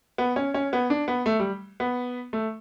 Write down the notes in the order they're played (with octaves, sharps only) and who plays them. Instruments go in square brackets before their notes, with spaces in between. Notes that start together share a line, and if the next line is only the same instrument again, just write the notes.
[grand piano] B3
C#4
C#4
B3
D4
B3
A3
G3
B3
A3